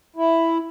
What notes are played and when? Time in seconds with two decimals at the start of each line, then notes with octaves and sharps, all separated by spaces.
0.16 E4